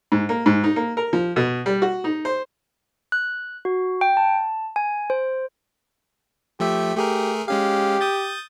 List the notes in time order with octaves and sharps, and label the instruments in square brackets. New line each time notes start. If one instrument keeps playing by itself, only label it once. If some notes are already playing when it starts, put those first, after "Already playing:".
[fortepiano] G#2
A#3
G#2
D#4
A#3
A#4
F3
B2
G3
F#4
D#4
C5
[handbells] F#6
F#4
G5
A5
G#5
C5
[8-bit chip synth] F3 A3 E5 [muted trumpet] G4
[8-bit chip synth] A3 G#4 A#4 [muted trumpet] G4
[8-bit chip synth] G#3 C#4 F5 [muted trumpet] G4
[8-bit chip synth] D#6 G6 A6